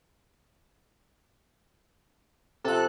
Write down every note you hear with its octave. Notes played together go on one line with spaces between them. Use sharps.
C3 F3 A4 F#6